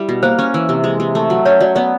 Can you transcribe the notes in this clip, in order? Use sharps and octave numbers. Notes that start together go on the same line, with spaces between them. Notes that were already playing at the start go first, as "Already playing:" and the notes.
Already playing: G3 E4
B2
A#3 C5
C#4
E3
C3
G#3
C3
A3
F#3
C#4 C#5
F#3 D5
B3 D5